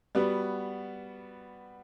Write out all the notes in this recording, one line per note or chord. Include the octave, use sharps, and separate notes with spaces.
G3 B3 F#4